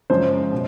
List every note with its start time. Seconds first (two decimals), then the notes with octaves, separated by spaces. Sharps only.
0.10 F#2 C#3 F3 G#3 C#4 C5
0.52 B2